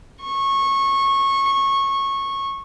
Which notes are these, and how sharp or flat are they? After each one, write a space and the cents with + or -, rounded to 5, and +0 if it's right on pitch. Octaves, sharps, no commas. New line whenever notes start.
C#6 -20